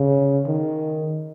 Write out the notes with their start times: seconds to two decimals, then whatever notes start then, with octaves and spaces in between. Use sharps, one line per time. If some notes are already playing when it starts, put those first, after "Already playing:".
Already playing: C#3
0.47 D#3